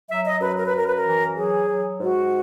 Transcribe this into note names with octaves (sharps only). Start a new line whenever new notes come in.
F#3 E5
D#5
F#2 B4
A#4
B4
F#2 A#4
B4
A#4
E3
F#3 G#4
F#3
G#2 F#4